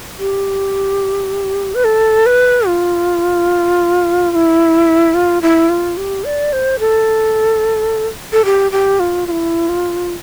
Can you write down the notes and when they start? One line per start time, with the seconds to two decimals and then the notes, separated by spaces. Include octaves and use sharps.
0.19 G4
1.75 B4
1.84 A4
2.26 B4
2.67 F4
4.32 F4
4.35 E4
5.14 F4
5.42 E4
5.69 F4
5.97 G4
6.25 D5
6.53 C5
6.79 A4
8.33 A4
8.45 G4
8.72 G4
9.00 F4
9.27 F4
9.31 E4
9.69 F4